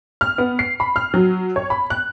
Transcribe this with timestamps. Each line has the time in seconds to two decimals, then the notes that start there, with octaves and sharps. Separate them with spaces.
0.21 F6
0.38 B3
0.59 C7
0.80 B5
0.96 F6
1.14 F#3
1.56 C#5
1.70 B5
1.90 F#6